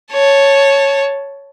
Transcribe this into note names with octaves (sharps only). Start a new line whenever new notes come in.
C#5 A5